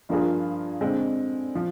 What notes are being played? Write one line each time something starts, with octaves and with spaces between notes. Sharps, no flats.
G2 F3 A#3 F4 G#4
D3 G#3 C4
F3